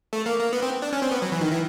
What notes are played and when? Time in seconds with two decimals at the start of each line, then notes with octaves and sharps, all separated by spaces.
0.13 A3
0.26 A#3
0.39 A#3
0.53 B3
0.62 C4
0.82 D4
0.93 C#4
1.02 C4
1.11 B3
1.22 F#3
1.32 E3
1.41 D#3
1.52 E3